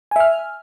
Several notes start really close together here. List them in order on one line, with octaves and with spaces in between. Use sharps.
G#5 E5 F6